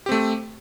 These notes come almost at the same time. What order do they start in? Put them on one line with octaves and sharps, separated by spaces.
G4 C4 A3